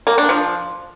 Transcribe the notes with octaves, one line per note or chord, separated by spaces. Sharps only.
A#3
D4
F3